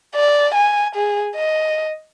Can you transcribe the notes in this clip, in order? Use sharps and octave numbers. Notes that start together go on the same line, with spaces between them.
D5
G#5
G#4
D#5